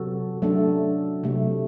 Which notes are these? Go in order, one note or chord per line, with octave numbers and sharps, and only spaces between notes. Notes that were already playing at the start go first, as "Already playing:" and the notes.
Already playing: C3 F#3 B3 F#4 A4
F#3 A3 D4 A4
C3 F#3 A3